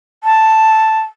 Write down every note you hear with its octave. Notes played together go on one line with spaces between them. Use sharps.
A5